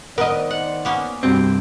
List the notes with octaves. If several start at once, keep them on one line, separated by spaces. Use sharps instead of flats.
D#3 B3 A#4 C5 D5 D#5
F#5
A#3 B3 C#4
C2 G2 G3 C4 F#4